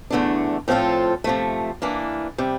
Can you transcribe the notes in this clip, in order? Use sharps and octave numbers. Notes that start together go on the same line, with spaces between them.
E2 D3 A3 D4
A2 F3 C4 F4 A4
C3 F3 A3
E3 A#3 D4
C3 G3